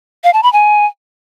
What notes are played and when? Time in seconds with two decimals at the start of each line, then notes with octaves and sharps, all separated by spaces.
0.24 F5
0.33 A5
0.43 B5
0.53 G#5